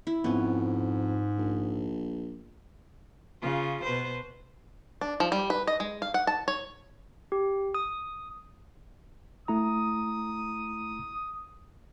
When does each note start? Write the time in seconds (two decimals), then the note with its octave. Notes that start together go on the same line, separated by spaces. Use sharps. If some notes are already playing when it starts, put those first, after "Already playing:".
0.07 E4
0.24 F2 G#2 B3 C#4
1.38 A#1
3.42 C#3 F4
3.84 B2 B4 C5
5.01 D4
5.20 F3
5.32 G3
5.50 B4
5.67 D#5
5.80 G#3
6.02 F5
6.14 F#5
6.27 A5
6.48 C#5
7.32 G4
7.74 D#6
9.48 A3 E4 A#5 D#6